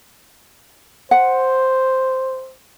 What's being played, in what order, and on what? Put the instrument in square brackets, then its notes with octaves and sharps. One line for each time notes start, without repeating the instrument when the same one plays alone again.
[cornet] C5 [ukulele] F#5